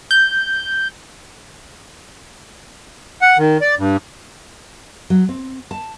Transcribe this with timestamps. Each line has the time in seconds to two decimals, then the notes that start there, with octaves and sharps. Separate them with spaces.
0.11 G6
3.22 F#5
3.38 D#3
3.61 D5
3.78 G2
5.10 F#3
5.29 C4
5.71 A5